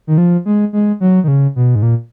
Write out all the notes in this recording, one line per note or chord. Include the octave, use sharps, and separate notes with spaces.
D#3
F3
G#3
G#3
F#3
D#3
C#3
B2
G#2
A#2